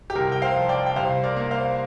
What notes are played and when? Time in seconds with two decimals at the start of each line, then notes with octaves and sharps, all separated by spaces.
0.10 G4
0.15 C2 A#4
0.32 G5
0.42 C5 F5
0.55 F3
0.69 D5 G5
0.86 G5
0.96 C2 C5 F5
1.24 A#4 D5
1.36 A#3
1.51 C5 F5